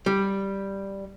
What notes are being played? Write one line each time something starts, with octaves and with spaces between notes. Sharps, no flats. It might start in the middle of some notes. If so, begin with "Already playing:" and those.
G3